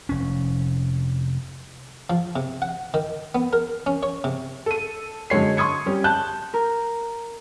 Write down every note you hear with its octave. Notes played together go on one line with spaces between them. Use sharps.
F1 C#4
F3
C3
F#5
D#3
B3
A#4
C#4
C#5
C3
A4 D#7
F#2 D3 G#3 C#5 C7
C6 C#6 D#6 G#6 C#7
G3 C#4
A5 F#6 G6
A#4